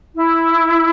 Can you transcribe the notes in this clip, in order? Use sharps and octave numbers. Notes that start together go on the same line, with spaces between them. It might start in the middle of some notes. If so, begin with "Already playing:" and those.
E4